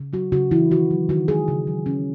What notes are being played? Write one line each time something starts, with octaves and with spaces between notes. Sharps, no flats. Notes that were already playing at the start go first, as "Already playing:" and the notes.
Already playing: C#3
F#3 F#4
C#3 F#4
E3 E4
D#3 F#4
F#3
D#3 F#4
G#3 G#4
C#3
F#3
C#3 C#4